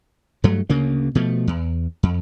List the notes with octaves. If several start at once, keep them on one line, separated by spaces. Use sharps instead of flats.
G2 F#3 A3
D2 C#3 A#3
B2 F3 A3
E2
F2